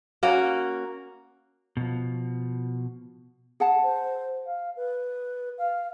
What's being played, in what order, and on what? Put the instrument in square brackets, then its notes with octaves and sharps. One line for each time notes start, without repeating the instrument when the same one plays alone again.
[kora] A#3 C#4 F#4
[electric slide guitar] B2 F3
[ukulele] G#4 F#5 A5
[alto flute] C5
F5
B4
F5